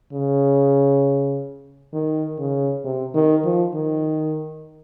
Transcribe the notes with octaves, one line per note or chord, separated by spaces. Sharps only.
C#3
D#3
C#3
C3
D#3
F3
D#3